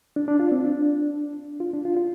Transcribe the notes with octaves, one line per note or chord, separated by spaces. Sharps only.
D4
D4
F4
C4
D4
F4
D4
F4
F4